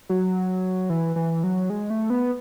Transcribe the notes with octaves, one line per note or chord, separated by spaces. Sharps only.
F#3
E3
E3
F#3
G#3
A3
B3